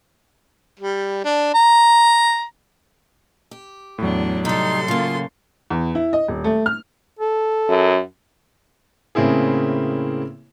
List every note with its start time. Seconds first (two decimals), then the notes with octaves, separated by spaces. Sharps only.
0.80 G3
1.24 D4
1.54 A#5
3.51 G4
3.98 E2 A2 F#3 D4
4.45 C3 G3 D#4 A4 C6
4.88 C#3 A#3 F4
5.70 E2
5.95 E4
6.13 D#5
6.28 D#1
6.44 A3
6.66 F6
7.19 A4
7.69 F#2
9.15 A2 C#3 A#3 C4 E4 G#4